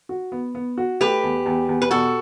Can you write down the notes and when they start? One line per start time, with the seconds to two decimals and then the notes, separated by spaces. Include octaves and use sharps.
0.09 F#4
0.32 B3
0.55 B3
0.78 F#4
1.01 A3 G4 B4
1.23 E2
1.46 E2
1.69 E2
1.82 B4
1.91 B2 F#4 A4